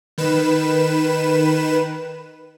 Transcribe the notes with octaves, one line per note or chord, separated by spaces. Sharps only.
D#3 B4 E7